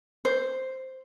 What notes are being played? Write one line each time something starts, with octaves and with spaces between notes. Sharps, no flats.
C5